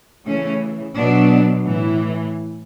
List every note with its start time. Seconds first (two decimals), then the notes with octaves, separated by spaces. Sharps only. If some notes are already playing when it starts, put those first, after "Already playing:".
0.26 C#3 E3 A3 C#4
0.96 B2 F#3 B3 D4
1.66 A2 E3